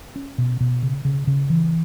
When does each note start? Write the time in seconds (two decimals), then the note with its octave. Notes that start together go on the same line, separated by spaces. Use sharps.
0.16 C#4
0.38 B2
0.60 B2
0.83 C#3
1.05 C#3
1.27 C#3
1.50 E3